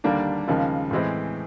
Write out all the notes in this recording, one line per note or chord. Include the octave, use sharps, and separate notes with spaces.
D#2 D3 G3 A#3 D4
D#2 C#3 F3 G#3
A2 E3 G#3 C4